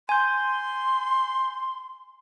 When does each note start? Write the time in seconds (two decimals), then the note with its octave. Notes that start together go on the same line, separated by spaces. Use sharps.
0.09 G#5 C6 G6